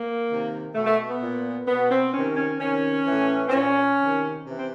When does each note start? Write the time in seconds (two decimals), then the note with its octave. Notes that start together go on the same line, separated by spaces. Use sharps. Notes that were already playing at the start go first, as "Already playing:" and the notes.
Already playing: A#3
0.29 C3 D#3
0.75 B2 A3
0.86 A3
1.10 B3
1.21 A#2
1.67 B2 B3
1.91 C4
2.14 C3 D#3 C#4
2.36 C#4
2.60 C3 D#3 C#4
3.06 A2 E3
3.48 C4
3.53 A#2 C#4
3.99 C3 D#3
4.45 C3 E3
4.59 C4